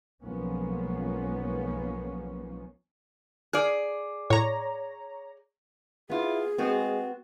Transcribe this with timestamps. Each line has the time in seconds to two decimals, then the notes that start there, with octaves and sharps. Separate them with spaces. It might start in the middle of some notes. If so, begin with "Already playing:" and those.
0.24 B1 F3 G#3 A#3 B3 C#4
3.53 G#4 D5 F6
4.30 A2 C#5 A#5
6.10 B3 E4 F4 G#4
6.58 G#3 B3 C4 F#4